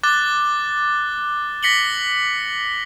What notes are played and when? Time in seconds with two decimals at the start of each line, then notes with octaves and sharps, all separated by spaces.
0.04 D6 F#6 A6 G7
1.63 A#6 B6 C#7 F#7 G7